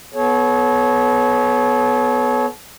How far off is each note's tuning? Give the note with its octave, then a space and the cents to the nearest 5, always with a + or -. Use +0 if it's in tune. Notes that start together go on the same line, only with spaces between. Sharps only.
B3 +0 A4 -40 C#5 +0